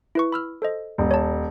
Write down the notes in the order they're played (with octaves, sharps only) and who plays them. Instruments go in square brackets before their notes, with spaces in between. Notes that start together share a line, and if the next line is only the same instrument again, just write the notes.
[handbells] E4 B4 C#6
B5 E6 F6
A4 C5 D#5
[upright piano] D#1
[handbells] C#5 A5